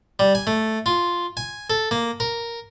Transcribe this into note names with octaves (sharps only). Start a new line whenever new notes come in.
G3
G#5
A3
F4
G#5
A4
A#3
A#4